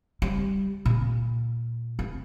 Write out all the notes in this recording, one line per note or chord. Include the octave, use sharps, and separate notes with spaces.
G3
A#2
D4